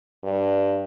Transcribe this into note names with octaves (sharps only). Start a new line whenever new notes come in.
G2